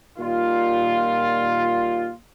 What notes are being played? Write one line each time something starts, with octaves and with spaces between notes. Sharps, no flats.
A#2 D#3 G3 F4